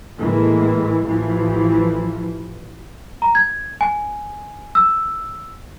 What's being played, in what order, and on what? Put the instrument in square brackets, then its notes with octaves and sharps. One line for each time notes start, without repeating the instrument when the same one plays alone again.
[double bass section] A2 E3 G#3 A#3
A1 E3 F3
[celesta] A#5
G#6
G#5
E6